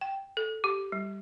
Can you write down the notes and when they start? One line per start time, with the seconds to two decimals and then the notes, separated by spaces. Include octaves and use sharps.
0.01 G5
0.37 A4
0.64 G4
0.92 G3